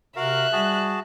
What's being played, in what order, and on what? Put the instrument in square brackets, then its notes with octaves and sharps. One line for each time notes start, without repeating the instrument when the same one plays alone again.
[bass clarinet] C3 [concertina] F#4 A#4 F5 [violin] E5 F#6
[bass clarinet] G3 [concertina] F#4 G#4 A5